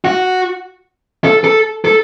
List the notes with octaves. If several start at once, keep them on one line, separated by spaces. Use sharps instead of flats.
F#4
A4
A4
A4